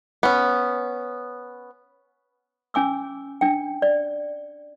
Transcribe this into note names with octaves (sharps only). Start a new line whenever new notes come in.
B3 C#4
C#4 G#5 D6 E6
D4 G5
D5